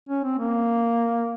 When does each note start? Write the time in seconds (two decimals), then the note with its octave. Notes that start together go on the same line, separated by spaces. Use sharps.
0.09 C#4
0.24 C4
0.39 A#3